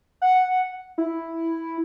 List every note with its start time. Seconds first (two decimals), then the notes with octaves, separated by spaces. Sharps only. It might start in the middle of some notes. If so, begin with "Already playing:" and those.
0.22 F#5
0.98 E4